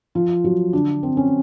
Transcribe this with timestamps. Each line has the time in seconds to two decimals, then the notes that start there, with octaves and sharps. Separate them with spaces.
0.15 F3 F4
0.44 F#3 F#4
0.73 D3 D4
1.03 C4
1.17 C#4